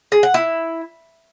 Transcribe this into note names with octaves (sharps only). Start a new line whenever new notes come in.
G#4
F#5
E4